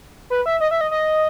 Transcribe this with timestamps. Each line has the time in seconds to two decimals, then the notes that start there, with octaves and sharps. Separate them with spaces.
0.30 B4
0.46 E5
0.60 D#5
0.71 E5
0.81 D#5
0.91 D#5